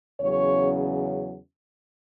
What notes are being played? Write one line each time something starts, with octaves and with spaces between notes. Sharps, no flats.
E2 C#3 F#3 C#4 C#5